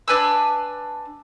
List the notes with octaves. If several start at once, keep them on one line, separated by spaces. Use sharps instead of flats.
D4 B4 G#5 E6